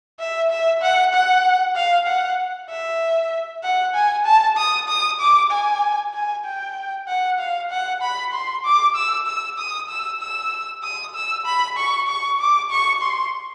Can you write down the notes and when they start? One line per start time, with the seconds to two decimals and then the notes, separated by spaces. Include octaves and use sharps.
0.20 E5
0.50 E5
0.82 F#5
1.14 F#5
1.76 F5
2.07 F#5
2.70 E5
3.63 F#5
3.94 G#5
4.25 A5
4.57 D#6
4.89 D#6
5.20 D6
5.51 G#5
6.14 G#5
6.45 G5
7.08 F#5
7.39 F5
7.71 F#5
8.02 B5
8.33 C6
8.65 D6
8.95 E6
9.27 E6
9.58 D#6
9.89 E6
10.20 E6
10.83 D#6
11.15 E6
11.46 B5
11.78 C#6
12.08 C#6
12.40 D6
12.71 C#6
13.02 C6